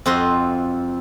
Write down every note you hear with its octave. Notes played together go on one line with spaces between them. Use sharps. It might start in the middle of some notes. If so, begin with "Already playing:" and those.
F2 C4 F4 F#4 D#5 C6